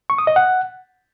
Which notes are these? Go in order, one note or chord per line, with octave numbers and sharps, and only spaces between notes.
C#6
D#6
D#5
F#5